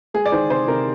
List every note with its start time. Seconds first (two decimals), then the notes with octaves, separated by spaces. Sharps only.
0.14 G#3 G#4
0.26 D5
0.32 D#3 C5
0.50 C3 C5
0.68 C3 A#4